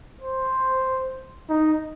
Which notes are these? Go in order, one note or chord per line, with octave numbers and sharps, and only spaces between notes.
C5
D#4